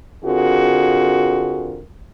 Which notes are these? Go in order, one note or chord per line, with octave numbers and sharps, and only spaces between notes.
D3 C4 F4 F#4 G#4 A#4